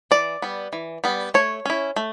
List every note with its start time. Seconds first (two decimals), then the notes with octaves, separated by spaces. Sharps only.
0.11 E3 D5
0.42 G3 B3
0.73 E3
1.04 G3 B3
1.34 A3 C#5
1.65 C#4 E4
1.96 A3